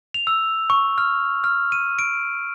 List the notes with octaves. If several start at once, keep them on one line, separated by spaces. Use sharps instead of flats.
F7
E6
C#6
F6
F6
D#7
D7